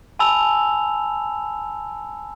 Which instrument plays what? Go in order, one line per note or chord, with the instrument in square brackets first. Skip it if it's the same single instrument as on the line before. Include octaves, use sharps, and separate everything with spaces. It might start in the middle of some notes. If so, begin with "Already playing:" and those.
[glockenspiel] G#5 A5 B5 E6 F7